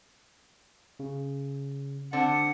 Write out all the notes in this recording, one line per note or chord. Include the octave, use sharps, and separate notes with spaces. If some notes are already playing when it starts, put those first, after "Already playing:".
C#3
D3 C4 F#5 A6